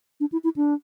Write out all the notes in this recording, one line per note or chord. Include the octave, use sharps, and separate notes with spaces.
D4
E4
E4
D4